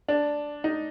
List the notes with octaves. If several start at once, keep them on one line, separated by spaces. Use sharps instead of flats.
D4
D#4